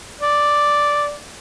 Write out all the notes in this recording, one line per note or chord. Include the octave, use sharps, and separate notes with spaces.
D5